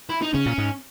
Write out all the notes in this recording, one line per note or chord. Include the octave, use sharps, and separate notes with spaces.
E4
D#4
C#3 C#4
A#2
G#2